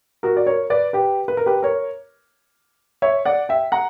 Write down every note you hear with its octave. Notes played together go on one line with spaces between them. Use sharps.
F#4 A#4
D5
A#4 C#5
B4 D5
G4 B4
B4
A#4
G4 B4
A#4 C#5
C#5 E5
D5 F#5
E5 G5
F#5 A#5